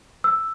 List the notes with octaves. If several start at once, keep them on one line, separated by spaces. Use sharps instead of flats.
E6